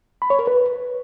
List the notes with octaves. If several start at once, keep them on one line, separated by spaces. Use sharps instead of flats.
B5
C#5
A#4
B4